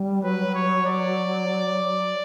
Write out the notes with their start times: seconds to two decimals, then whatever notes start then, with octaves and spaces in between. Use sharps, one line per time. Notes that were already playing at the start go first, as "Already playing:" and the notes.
Already playing: G3
0.23 F#3 B4
0.55 C#5
0.86 D5